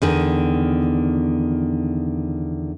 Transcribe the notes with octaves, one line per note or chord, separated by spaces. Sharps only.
E2 D3 D#3